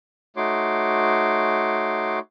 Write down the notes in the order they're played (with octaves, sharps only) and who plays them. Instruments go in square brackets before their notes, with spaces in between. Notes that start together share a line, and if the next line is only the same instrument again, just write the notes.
[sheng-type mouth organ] A3 D#4 F#4 C#5 C6 D6